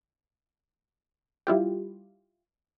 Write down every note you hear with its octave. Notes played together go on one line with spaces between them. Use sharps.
G3 E4 F4 G4